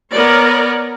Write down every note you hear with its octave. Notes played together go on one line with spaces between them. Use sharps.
B3 A#4 C#5 D5